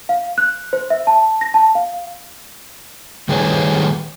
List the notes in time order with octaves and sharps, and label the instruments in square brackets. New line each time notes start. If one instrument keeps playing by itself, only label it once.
[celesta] F5
F#6
C5
E5
A5
A#6
A5
F5
[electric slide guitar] D#3 G3 A3 G#4 B4 C#5